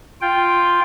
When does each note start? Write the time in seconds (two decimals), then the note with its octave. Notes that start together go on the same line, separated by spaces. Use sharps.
0.21 F4 G5